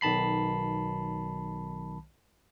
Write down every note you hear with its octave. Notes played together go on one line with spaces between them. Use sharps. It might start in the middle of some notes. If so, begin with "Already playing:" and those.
B1 D#3 A5 B5 C7